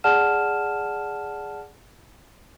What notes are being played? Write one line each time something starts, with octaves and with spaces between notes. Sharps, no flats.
G#4 D5 F#5 A5 F6 E7